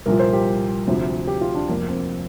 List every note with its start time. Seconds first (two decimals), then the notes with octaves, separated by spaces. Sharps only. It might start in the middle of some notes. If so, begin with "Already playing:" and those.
0.06 C2 A#2 F3 A#4
0.19 C5
0.33 G4
0.87 D2 C3 F3
1.27 G4
1.41 F4
1.54 D4
1.68 F1 F2 F3 A#3
1.89 C4